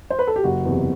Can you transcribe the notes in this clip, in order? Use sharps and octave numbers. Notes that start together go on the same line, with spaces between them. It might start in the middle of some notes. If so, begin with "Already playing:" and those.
C5
B4
A4
G4
F#1 F#4
E2 C3